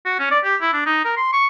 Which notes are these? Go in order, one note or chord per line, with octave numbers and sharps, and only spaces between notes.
F#4
C#4
D5
G4
E4
D4
D#4
A#4
C6
C#6